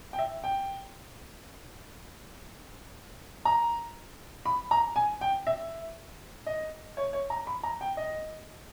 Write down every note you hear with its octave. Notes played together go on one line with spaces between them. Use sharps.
G5
E5
G5
A#5
B5
A#5
G#5
G5
E5
D#5
C#5
C#5
A#5
B5
A#5
G5
D#5